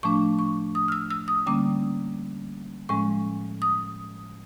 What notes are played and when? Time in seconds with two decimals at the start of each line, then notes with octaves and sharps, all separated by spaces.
0.03 A2 F3 A3 D4 C#6
0.39 C#6
0.75 D#6
0.88 F6
0.92 E6
1.11 E6
1.28 D#6
1.46 D3 G3 A#3 C#4 D6
2.89 A2 F3 G#3 C#4 C#6
3.62 D#6